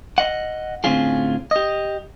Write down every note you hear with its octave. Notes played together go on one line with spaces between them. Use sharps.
D#5 F#5
A2 D3 C4 C#4 F4 G#4
G4 D#5